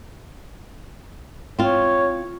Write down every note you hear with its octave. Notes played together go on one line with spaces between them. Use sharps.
C4 F4 C#5